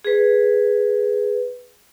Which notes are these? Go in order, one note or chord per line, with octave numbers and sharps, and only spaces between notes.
G#4 B4